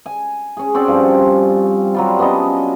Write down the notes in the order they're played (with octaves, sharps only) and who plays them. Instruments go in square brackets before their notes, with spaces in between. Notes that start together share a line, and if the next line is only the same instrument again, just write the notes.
[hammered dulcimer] G#5
C#4 G#4
C4 C#4 F#4 D5
G2 F3
F#3 G3 F4
B3 C#4 D4 D#5